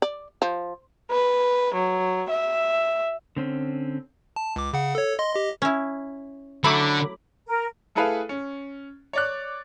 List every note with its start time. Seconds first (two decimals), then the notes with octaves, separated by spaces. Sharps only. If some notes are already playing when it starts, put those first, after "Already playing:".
0.02 D5
0.42 F3
1.11 B4
1.75 F#3
2.31 E5
3.37 D3 C4 C#4
4.36 A5
4.56 C#2 D6
4.73 C#3 F#5
4.95 A4 C#5
5.19 D#5 C6
5.34 G4 D#5
5.62 C#4 E4
6.64 D3 F#3 A3 E4 B5 D6
7.48 A#4
7.95 A3 E4 G#4 A4 B4 F5
8.29 C#4
9.13 C#5 D5 F#6